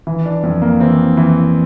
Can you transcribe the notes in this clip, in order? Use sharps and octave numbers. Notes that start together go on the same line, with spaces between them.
E3
D4
F2
A#3
E3 C4
E3